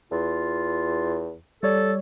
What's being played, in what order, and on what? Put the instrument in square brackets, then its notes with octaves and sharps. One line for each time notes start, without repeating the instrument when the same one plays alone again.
[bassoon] E2 [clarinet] F4
[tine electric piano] G3 C#5 D5 [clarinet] A4